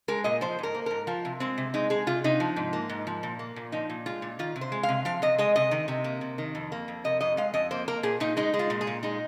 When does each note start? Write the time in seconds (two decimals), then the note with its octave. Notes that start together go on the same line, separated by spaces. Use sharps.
0.08 G#3 A#4
0.24 A#2 D#5
0.41 F3 C5
0.59 G#2 A#4
0.74 A#3
0.86 G#2 A#4
1.07 F3 F4
1.25 C3
1.40 G#3 C4
1.58 C3
1.74 G#3 D#4
1.90 G#3 G#4
2.07 C3 F4
2.24 C3 D#4
2.40 F3
2.56 G#2
2.73 A#3
2.89 G#2
3.07 F3
3.23 A#2
3.39 A#3
3.56 A#2
3.72 F3 D#4
3.90 A#2
4.06 G#3 F4
4.22 A#2
4.39 D#3 F4
4.56 C3
4.61 C5
4.72 G#3
4.83 F5
4.89 C3
5.05 F3 F5
5.22 C3 D#5
5.38 G#3 D#5
5.56 C3 D#5
5.71 D#3
5.88 C3
6.04 A#3
6.21 C3
6.38 D#3
6.55 F2
6.72 A#3
6.88 F2
7.04 C3 D#5
7.21 F2 D#5
7.37 G#3 F5
7.54 F2 D#5
7.71 A#3 C5
7.88 A#3 A#4
8.03 A#2 G#4
8.20 A#2 D#4
8.37 G#3 D#4
8.54 G#3
8.59 F4
8.70 A#2
8.81 G#4
8.87 A#2
9.03 G#3 D#4